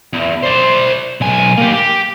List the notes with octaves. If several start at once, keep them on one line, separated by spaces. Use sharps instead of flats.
E2
C5 D5
B1 G#5
A#3 G4
G4